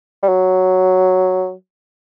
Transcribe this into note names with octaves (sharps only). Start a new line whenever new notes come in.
G3
F#3